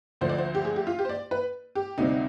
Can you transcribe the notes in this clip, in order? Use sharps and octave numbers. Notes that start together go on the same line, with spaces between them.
D2 D3 F3 C5
D5
C5
G4
G#4
G4
F4
G4
C5
D5
B4
G4
D2 C3 G3 C4 D#4